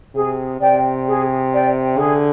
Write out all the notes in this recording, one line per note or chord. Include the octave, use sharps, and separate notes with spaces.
C3 G#4
C3 D5 G5
G#4
D5 G5
D3 G#4